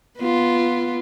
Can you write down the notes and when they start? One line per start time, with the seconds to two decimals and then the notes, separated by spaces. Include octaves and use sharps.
0.19 B3 F4